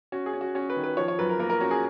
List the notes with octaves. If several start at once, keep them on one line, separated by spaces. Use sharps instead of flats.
C#4 F#4
G#4
C#4
F#4
C#4 F#4
B4
D#3
B4
F3 C#5
C#5
F#2 B4
A#4
A#3 A#4
A#4
C#4 F#4
G#4